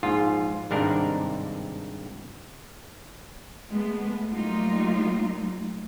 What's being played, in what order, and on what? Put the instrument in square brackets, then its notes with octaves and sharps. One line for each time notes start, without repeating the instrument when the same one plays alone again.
[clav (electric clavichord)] A#1 G#2 F4
G#1 G2 C3 D4 D#4 A#4
[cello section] G#3 A3 B3
F#3 G3 A3 A#3 D#4 F4